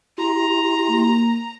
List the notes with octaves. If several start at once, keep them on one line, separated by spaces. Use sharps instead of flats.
E4 G4 A#5 C6
A#3